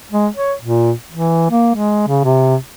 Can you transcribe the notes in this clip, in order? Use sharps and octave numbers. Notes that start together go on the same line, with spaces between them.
G#3
C#5
A#2
E3
A#3
G#3
C#3
C3